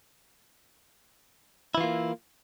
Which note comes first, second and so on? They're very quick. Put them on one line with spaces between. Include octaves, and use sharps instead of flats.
E4 E3 F4 A#3